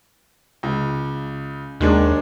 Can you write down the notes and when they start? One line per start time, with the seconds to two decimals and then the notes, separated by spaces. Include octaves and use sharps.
0.63 C#2
1.80 D#2 D#3 G#3 D4